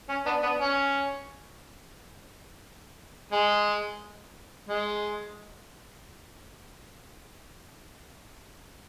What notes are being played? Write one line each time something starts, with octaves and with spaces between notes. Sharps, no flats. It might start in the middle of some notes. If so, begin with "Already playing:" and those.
C#4
B3 D4
B3 D4
C#4
G#3
G#3